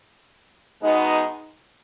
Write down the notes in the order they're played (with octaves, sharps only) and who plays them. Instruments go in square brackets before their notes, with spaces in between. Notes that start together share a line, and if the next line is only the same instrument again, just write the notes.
[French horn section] B2 G#3 B3 D#4